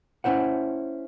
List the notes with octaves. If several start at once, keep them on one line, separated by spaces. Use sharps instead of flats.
C#4 E4 C5 F#5